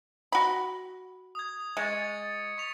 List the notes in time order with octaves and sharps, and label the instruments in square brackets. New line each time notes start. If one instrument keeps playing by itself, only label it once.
[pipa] F#4 B5
[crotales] D#6 G#6
[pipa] G#3 [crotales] C#6 A6 C#7
[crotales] A6
C#6 B6 F7